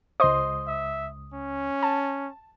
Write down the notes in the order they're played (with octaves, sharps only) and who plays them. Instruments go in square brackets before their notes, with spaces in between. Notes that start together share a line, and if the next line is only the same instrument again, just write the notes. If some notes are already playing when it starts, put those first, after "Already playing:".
[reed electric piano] C#2 D#6 [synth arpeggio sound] C5 D#5 C6
[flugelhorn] E5
C#4
[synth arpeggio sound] A5